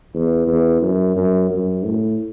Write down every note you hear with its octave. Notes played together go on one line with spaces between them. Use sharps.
E2
E2
F#2
F#2
F#2
A2